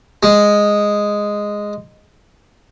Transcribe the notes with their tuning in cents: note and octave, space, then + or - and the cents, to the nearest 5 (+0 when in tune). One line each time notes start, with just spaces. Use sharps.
G#3 -5